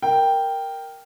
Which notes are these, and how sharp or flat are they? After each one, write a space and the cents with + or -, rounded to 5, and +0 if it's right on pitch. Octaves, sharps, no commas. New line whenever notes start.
A#4 +0 G5 +0